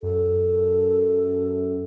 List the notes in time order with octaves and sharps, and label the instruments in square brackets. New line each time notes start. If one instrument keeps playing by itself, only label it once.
[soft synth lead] F#2 [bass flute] A4